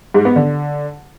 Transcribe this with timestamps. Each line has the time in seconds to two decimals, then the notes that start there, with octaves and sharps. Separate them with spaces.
0.14 G#2
0.25 B3
0.36 D3